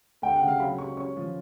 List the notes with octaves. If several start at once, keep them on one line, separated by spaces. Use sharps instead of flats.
D2 G5
F#5
C#3
F5
F#3 B5
F#3 C#6
C#4 C#6
F3